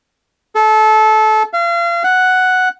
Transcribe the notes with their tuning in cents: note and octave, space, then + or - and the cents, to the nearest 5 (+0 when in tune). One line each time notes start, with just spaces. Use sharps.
A4 -25
F5 -35
F#5 +0